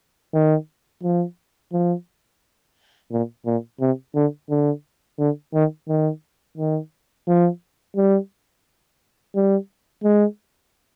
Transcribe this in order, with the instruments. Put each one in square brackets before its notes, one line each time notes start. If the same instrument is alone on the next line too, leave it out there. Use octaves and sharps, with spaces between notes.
[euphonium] D#3
F3
F3
A#2
A#2
C3
D3
D3
D3
D#3
D#3
D#3
F3
G3
G3
G#3